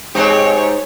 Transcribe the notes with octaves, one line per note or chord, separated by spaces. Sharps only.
G#2 G#3 C4 G4 C#5